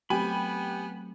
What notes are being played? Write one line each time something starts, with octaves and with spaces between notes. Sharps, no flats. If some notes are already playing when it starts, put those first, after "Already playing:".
F#3 A3 B3 C4 G4 G#5 B5